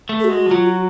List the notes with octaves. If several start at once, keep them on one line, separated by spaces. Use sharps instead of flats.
A3
A4
G#3 F#4
F3
F#3 F4
F#4